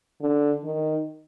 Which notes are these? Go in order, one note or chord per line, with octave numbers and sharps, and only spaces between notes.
D3
D#3